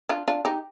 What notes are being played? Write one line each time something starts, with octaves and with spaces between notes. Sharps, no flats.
D4 F4
D4 F4
D#4 G4